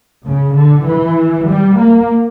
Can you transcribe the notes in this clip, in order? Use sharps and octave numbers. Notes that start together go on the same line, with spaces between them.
C#3
D3
E3
G3
A#3